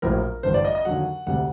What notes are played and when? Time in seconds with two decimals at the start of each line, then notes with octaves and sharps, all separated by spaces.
0.02 A#1 A2 F#3 A#4
0.43 A1 G2 D3 C5
0.54 D5
0.65 D#5
0.75 D#5
0.85 D#2 D3 F#3 F#5
1.27 D2 C3 G3 F#5